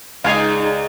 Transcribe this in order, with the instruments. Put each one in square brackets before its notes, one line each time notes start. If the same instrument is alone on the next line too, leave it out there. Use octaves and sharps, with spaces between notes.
[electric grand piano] C#2 [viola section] D#4 G#4 D5 [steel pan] F5 G#5